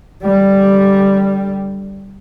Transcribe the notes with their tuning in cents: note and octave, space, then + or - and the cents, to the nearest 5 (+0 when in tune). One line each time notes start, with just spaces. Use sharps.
D3 -10 G3 +0